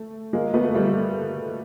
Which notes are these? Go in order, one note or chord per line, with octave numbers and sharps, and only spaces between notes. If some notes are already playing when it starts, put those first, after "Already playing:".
Already playing: A3
G#3 A#3
A3 B3
G3 A3